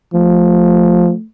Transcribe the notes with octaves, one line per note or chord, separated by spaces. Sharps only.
F3 A3